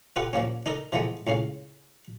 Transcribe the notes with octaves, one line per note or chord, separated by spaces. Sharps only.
F4 G4 A4 B4 F#5
A#2 F3 A#3 C#4
D4 D#4 A4 A#4
E3 F3 G#3 A3 B3
C#2 A2 C#4 F5